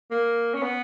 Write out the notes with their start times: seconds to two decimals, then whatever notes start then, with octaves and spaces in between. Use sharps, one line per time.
0.11 A#3
0.54 C#4
0.62 B3